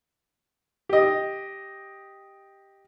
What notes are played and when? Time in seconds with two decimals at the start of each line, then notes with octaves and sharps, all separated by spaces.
0.89 G4 D#5